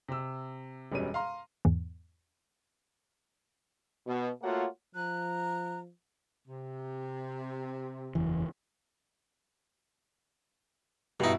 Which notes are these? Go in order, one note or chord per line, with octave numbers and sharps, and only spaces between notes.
C3 E6
E1 F#2 B2 G3 C#5 D#7
F5 A#5 C6
E2 G#2 E3
B2
A3 A#3 F4 F#4 C#5 F#5
F3 A#5 F#6
C3
F#1 E2 E3
G2 B2 D#4 E4